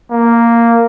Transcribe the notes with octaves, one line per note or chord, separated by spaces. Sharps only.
A#3